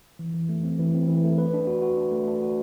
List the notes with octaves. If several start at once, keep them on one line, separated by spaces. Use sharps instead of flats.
E3
E3
A3
C4
E3
C4
E3
A3
B4
D4
F#4
F#4
D4
A3
D4
F#4